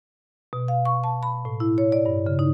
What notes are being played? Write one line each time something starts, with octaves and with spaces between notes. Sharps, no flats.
B2
F5
C#6
A5
B5
A2
E4
C#5
D5
G2
C#3
D#4